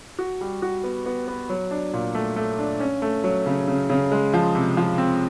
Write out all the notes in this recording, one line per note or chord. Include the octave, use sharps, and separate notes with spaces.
F#4
G3
F#4
B3
B3
B3
F#3
D4
A#2
A3
A3
D4
C#4
A3
F#3
C#3
C#3
C#3
G#3
F3
C3
F3
C4